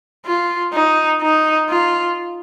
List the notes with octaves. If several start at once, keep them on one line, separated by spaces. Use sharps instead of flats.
F4
D#4
D#4
F4